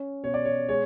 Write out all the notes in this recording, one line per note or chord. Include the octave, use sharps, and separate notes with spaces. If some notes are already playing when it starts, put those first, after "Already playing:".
Already playing: C#4 C#5
B2 C#5
D5
C#5
G#3 C#5